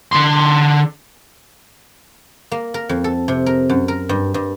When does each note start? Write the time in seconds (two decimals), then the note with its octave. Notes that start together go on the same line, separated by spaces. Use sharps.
0.13 D3 C6
2.52 A#3
2.74 A#4
2.89 F2
3.04 A4
3.28 C3
3.46 A#4
3.69 F#2
3.88 A#4
4.09 G2
4.34 G2